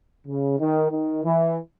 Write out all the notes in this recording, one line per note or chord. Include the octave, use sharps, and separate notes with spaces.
C#3
D#3
D#3
E3